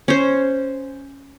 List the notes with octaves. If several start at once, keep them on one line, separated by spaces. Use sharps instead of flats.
C#4 C5